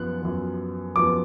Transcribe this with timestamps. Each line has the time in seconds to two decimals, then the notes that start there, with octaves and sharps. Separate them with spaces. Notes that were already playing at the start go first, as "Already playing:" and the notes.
Already playing: F#2 F3 B3 F#6
0.22 F#2 F3 B3
0.96 F#2 F3 B3 D6